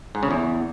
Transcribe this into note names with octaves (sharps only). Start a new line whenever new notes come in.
G#2
C#3
E2